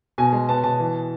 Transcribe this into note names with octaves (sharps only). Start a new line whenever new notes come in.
B2 G#5
G#3
B3 A5
B2 A5
E3